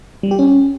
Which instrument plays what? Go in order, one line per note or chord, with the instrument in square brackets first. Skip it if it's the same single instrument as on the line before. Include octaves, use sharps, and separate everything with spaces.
[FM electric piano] G3
G4
C#4